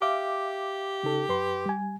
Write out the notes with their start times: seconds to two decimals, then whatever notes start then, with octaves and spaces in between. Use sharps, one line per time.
0.02 G4 E5 F5 D6
1.03 C#3 D#4 A4
1.29 F#2 B4 C6
1.66 G3 G#5